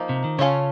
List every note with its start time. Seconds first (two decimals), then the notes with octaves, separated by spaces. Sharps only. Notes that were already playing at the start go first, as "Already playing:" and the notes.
Already playing: F3 A#3 D#4
0.09 C3
0.24 D#3
0.38 C#3 C#4 F4 A4 C#5